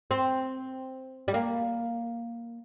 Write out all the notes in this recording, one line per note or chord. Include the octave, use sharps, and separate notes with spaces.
C4
G3
A#3